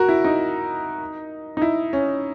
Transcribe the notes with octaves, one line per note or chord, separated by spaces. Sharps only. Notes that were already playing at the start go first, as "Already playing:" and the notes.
Already playing: F#4 A#4
E4
D#4
D#4
E4
C#4